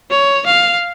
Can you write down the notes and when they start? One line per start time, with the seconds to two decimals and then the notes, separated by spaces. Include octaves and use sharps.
0.11 C#5
0.46 F5